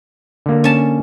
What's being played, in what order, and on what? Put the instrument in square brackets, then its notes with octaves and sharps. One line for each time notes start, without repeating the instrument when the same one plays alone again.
[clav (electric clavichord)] D3 A#3
[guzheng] C#4 A5